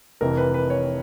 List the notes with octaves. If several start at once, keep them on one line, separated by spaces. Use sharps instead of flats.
F1 F2 C3 E3 A#4
B4
B4
C#5